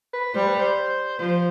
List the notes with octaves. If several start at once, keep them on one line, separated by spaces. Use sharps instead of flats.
B4
G3 C5
B4
C5
F3 C5